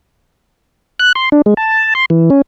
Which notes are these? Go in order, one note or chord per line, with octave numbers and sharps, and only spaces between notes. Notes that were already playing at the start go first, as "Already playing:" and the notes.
F#6
C6
D4
G#3
A5
C6
E3
C#4